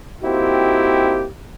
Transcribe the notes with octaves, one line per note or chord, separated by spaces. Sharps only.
A#3 C4 D#4 E4 F#4 G4